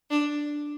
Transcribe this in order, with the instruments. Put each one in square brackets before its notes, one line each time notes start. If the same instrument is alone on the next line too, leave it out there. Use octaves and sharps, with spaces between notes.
[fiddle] D4